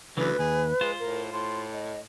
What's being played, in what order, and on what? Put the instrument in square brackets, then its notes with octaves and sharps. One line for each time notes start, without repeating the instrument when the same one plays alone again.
[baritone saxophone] D2 [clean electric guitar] C#3 E3 F#3 [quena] B4
[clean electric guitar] D#2 [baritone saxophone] G#4
[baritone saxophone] G#3 [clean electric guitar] F4 C5
[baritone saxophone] A2 [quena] A#4
[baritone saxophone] A2 [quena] C6
[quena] D#5